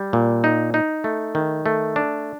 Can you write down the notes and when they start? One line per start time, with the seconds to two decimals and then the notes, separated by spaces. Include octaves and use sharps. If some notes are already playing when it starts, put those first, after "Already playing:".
Already playing: G3
0.13 A#2
0.44 D#4
0.74 D#4
1.04 A3
1.35 D#3
1.66 A3
1.96 D4